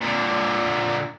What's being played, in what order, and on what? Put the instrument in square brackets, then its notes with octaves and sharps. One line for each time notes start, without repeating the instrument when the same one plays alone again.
[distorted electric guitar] A#2 D3